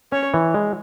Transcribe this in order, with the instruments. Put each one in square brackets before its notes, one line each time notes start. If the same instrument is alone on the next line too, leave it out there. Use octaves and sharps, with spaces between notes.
[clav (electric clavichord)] C#4 [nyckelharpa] C#5
[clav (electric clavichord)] E3
G#3